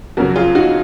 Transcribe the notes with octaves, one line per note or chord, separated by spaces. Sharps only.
F2 C#3 F#3 F#4 A#4
F4 G#4
D#4 F#4